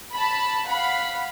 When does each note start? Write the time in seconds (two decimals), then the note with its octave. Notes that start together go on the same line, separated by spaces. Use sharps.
0.12 A5 B5
0.68 F5 F#5 B5